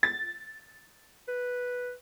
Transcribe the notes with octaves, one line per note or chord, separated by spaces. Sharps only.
A6
B4